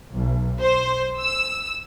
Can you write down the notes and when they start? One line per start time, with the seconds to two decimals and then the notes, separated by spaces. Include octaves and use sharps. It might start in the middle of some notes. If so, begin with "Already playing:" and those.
0.13 B1
0.61 C5
1.19 E6